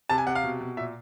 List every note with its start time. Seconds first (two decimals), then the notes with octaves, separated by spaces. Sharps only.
0.09 C3 A5
0.18 G#5
0.27 C3 F#5
0.35 F5
0.44 B2
0.61 B2
0.77 A#2 E5